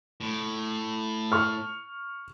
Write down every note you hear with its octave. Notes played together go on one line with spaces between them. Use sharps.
A2
C#6 F6